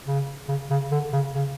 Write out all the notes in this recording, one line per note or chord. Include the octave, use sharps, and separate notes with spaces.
C#3
C#3
C#3
D3
C#3
C#3